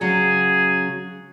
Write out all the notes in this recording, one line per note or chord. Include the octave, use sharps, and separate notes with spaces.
C#3 F#3 G#4